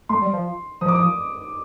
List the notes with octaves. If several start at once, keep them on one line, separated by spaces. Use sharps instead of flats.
A3 C6
G3
F3
F3 D#6
D6
D#6